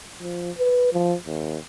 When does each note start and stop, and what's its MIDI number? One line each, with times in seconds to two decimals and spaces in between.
0.19 0.51 53
0.58 0.92 71
0.93 1.15 53
1.26 1.57 39